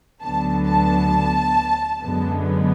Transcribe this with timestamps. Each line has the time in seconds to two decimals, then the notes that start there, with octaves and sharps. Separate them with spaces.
0.22 D2 D3 F#3 B3 A5
0.67 A5
2.00 F#2 D3 G#3 B3